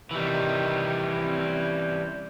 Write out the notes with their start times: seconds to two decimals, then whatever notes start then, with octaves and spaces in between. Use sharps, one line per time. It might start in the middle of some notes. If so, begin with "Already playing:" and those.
0.11 C3 D#3 E3 G3
1.22 C4 C#4